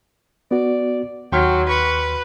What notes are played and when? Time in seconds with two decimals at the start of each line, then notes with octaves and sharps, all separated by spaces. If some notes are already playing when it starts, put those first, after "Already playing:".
0.51 B3 F#4 D5
1.32 D#2 F#3 G5 C6 F6
1.69 B4 C#6